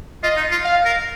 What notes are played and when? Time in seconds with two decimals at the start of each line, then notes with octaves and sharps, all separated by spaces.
0.23 F4 D#5
0.37 D#4
0.51 F4
0.64 F5
0.85 A#4